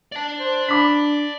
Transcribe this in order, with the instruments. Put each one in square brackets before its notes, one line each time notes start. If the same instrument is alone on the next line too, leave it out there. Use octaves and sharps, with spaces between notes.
[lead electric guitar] D5 A5
[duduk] C5
[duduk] D4 [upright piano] B5 D6 B6